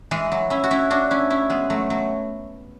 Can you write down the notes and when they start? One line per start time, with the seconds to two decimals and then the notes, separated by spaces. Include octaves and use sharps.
0.11 E3 G#3
0.32 F#3
0.50 C#4 E4
0.64 F#4
0.71 C#4 E4
0.90 D4 F#4
1.11 C#4 E4
1.30 C#4 E4
1.50 G#3 B3
1.70 F#3 A3
1.90 F#3